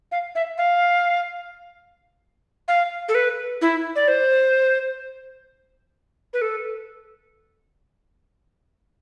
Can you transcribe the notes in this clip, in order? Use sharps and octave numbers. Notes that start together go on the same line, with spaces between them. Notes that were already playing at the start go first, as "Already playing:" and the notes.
F5
E5
F5
F5
A4
B4
E4
D5
C5
B4
A4